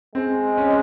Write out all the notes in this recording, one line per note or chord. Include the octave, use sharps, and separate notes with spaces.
G#3 C4
C#4